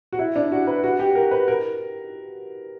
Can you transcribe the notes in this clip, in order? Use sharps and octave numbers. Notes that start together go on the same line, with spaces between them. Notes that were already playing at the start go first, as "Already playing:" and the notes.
F#4
E4
D4
F#4
B4
F#4
G4
A#4
B4
A#4